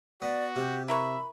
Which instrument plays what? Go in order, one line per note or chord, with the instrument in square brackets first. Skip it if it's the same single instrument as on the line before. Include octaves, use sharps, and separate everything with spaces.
[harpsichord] B3 [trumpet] F#4 [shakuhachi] D5
[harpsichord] C3 [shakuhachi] G4
[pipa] E4 A#4 C#6 [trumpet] E5 [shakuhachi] B5